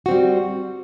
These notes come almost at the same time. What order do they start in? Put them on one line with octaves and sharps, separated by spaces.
F#4 C4 G3